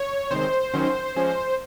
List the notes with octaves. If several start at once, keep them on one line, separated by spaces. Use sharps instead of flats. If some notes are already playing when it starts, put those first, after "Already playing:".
Already playing: C#5
C3 D#3 G#3 C5
D#3 F#3 C#4
F3 G#3 C#4